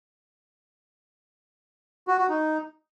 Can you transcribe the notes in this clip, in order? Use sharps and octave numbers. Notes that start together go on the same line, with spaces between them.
F#4
F#4
D#4